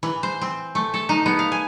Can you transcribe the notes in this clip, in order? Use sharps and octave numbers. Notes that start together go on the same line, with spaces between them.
E3
C5
C4
A3
A4
D#4
B3
F5
G#5